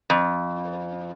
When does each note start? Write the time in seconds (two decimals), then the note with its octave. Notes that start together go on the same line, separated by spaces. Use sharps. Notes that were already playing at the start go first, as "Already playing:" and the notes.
0.10 F2